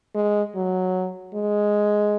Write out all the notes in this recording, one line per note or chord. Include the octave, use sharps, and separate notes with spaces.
G#3
F#3
G#3